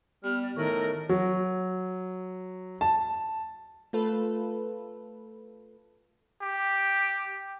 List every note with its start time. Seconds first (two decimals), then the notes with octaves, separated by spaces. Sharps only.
0.24 G3 B3 F6
0.43 D5
0.56 A2 D#3 A#4 C#6
0.73 D#3
1.09 F#3
2.81 A5
3.93 A3 F4 A4 B4
6.42 G4